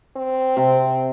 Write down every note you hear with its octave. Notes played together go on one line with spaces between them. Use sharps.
C4
C3